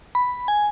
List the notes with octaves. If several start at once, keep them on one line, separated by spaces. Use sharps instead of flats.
B5
G#5